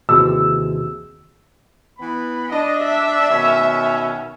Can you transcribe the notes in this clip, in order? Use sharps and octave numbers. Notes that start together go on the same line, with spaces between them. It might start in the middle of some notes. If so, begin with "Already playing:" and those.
D#2 C3 E3 F#4 G#4 E6
E3 B3 B5
D4 D#5
E5
B2 D#3 C#4